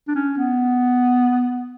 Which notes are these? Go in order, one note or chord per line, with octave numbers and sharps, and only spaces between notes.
D4
C#4
B3